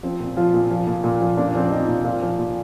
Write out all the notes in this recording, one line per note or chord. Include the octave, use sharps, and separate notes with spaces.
F3 C4
A#2
F3 F4
A#2
F3
A#2
A#2
F3
A#2 D4
F3 C4
D4
F3 D#4
A#2
A#2 F4
F3
A#2